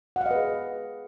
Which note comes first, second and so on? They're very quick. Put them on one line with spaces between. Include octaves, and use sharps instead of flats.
F#5 F5 D#5 B4 G#4